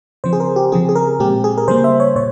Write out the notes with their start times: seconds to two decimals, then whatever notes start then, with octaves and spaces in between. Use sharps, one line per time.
0.24 C#3 F3 C4 C5
0.33 G#4
0.40 A#4
0.56 G4
0.72 C#3 F3 C4 G#4
0.89 G#4
0.95 A#4
1.20 A#2 G#3 C4 G4
1.44 G#4
1.58 A#4
1.68 C#3 G3 A#3 C5
1.84 E5
2.00 C#5
2.16 A#2 C#5